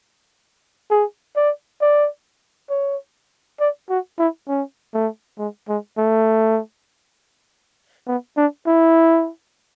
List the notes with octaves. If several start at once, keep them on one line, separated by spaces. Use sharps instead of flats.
G#4
D5
D5
C#5
D5
F#4
E4
C#4
A3
G#3
G#3
A3
B3
D4
E4